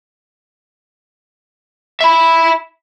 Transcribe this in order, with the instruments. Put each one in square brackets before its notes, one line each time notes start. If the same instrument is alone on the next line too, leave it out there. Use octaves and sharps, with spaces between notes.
[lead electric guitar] E5 B5